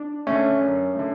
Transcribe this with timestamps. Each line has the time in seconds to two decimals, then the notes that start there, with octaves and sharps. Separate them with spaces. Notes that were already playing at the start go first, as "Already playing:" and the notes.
Already playing: D4
0.27 D3 A3 C#4
0.61 F#2
0.95 D3 A3